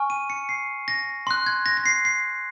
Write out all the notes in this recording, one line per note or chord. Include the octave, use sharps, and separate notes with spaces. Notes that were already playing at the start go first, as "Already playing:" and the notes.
Already playing: G#5 C#6 F6
D#7
C#7
C7
A#6
C6 F#6
G#6
A#6
A#6
C7
C7